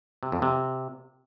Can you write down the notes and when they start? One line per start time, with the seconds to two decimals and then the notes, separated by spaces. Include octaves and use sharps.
0.23 C3
0.32 F2
0.42 C3